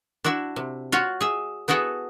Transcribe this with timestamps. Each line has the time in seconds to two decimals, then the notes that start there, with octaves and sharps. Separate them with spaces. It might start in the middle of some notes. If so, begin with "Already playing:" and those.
0.24 D4 E4 F#4 E5
0.56 C3
0.92 F4 F#4 C#5
1.21 G#4 E5
1.68 B3 E4 F#4 G#4 A4